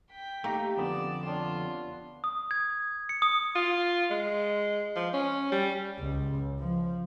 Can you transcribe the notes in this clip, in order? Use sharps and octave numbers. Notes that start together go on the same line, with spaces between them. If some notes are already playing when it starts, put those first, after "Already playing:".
G5 B6
A3 A#3 D#4 G4
F2 D3 B3 D5 D#6 E7
D4 F4 C#5 G5
D#6
G#6
C#7
D#6
F4
G#3
F3
C#4
G3
C#2
F3